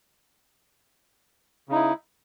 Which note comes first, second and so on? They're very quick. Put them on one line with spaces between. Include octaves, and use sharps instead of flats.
C#3 D#4 E4